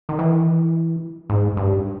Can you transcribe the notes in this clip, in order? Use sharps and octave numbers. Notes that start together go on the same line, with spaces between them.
D#3
E3
G#2
G2